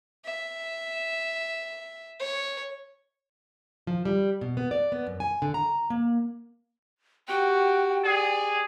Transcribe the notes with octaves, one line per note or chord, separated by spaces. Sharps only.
E5
C#5
F3
G3
B2
B3
D5
B3
F#2
G#5
D3
A#5
A#3
F#4 G4 G5
G#4 D5